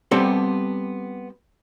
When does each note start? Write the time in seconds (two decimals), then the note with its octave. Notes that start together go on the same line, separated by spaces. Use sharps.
0.11 G3 B3 C4 G4 A4 B5